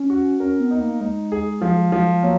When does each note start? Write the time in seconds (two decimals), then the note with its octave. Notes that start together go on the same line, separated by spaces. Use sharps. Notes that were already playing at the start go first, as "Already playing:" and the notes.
Already playing: C#4
0.10 F#4
0.40 C#4 A#4
0.60 B3
0.71 D#4
0.81 A#3
1.01 G#3 D#4
1.32 G#4
1.61 F3
1.92 F3
2.23 F#3 A#3